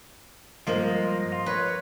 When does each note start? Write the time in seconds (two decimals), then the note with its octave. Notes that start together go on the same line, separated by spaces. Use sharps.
0.67 G2 F3 G#3 A#3 F4 D#5
1.32 F4
1.46 B4 C#5